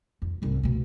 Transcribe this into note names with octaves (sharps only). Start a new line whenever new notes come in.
F2
C2 G#2
B2 A3